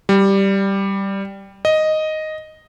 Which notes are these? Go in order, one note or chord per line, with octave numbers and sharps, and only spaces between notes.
G3
D#5